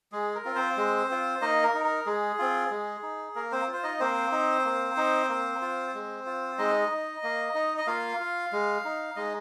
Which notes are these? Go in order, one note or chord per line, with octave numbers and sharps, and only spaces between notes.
G#3 G#4
A#4
C4 F4
C4 C5
G#3
C4 F4
A#3 D#4 D#5
A#4
D#4
A#4
G#3 G#4
C4 F4
G#3
D#4
A#3 A#4
C4 C5
F4
C5
D#4 D#5
A#3 C4 C5
D#4
A#3
D#4
A#3
F4
G#3
F4
G#3 D#4 D#5
D#4
A#3
D#4
D#5
A#3 F4 F5
F4
G#3
D#4
G#3 D#4 D#5